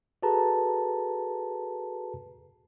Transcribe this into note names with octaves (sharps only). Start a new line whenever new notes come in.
F#4 G#4 A4 B4 A5 A#5